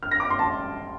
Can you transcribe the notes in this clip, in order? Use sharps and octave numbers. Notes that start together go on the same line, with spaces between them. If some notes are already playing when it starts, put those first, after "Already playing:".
F6
A#6
D6
C6
A5